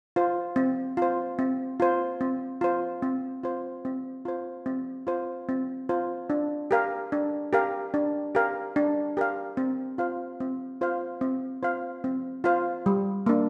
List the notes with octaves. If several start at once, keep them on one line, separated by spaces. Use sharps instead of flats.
F4 C5
C4
F4 C5
C4
F4 C5
C4
F4 C5
C4
F4 C5
C4
F4 C5
C4
F4 C5
C4
F4 C5
D4
G4 A#4 F5
D4
G4 A#4 F5
D4
G4 A#4 F5
D4
G4 A#4 F5
C4
F4 C5 F5
C4
F4 C5 F5
C4
F4 C5 F5
C4
F4 C5 F5
G3
A#3 D4